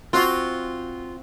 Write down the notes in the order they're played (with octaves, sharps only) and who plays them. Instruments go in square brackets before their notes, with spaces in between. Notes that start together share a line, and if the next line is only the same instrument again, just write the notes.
[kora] C4 F#4 [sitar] F4